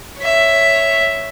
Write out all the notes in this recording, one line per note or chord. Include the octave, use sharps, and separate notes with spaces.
C#5 E5